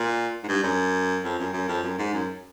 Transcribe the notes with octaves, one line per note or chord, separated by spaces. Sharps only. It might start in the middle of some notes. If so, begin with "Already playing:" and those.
Already playing: A#2
G#2
G2
F#2
F2
F#2
F#2
F2
F#2
G#2
F#2